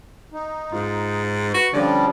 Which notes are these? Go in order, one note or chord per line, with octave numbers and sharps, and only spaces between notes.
D#4
G#2 F4
F#4 B4
D3 F3 G3 C#4 G4 D5